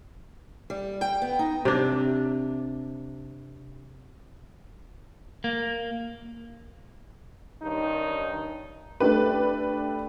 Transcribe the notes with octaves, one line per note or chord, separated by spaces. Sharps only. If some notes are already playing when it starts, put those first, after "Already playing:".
G3
G5
B3
D#4
C3 D4
A#3
G2 D#3 C#4 D#4
A3 D4 G4 B4